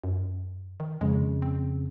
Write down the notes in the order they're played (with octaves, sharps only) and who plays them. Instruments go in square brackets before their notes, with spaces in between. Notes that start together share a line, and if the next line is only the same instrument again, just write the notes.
[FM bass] F#2
D#3
[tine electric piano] F2 C#3 [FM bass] G#3
[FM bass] C4